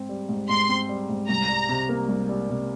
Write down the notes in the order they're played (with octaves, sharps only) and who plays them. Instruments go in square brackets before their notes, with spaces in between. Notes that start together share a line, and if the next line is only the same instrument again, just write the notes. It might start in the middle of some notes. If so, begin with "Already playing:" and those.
Already playing: [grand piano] G#2 C4
G3
G#2
[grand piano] G#2 [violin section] C6
[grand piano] C4
G3
G#2
[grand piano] C2 [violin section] A#5
[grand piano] G3
C3
A#3
C2
G3
C3